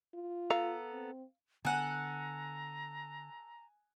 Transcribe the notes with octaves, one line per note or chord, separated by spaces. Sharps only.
F4
B3 A4 F5 A#5
C4
D3 B3 A4 F#5 G#5 A#5 F#6